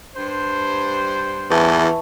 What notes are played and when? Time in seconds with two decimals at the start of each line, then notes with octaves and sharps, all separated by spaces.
0.16 G2 C5
1.50 E2 E3 B4 A5 C#6